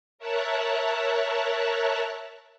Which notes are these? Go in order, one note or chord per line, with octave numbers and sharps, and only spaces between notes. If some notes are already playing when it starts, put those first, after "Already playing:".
A#4 C#5 E5 A5 A#5 F#6